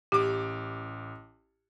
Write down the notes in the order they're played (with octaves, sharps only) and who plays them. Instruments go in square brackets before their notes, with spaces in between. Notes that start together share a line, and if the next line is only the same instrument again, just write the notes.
[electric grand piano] A1 D6 [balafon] G4